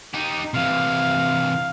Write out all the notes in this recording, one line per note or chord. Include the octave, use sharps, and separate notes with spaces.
D#4 G4
C3 E3 F5